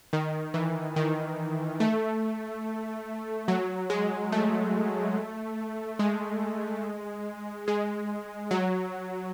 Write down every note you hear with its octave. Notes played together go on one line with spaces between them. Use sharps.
D#3
E3
D#3
A3
F#3
G#3
A3
G#3
G#3
F#3